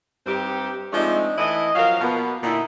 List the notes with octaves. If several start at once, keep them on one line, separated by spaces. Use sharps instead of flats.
G2 C4 D#4 G4
F3 G#3 A3 C4 D4 D#4
E3 A3 E4 D#5
F3 F#3 C#4 A#4 F5
B2 F3 A#3 B3
A#2 D3 D#4 E4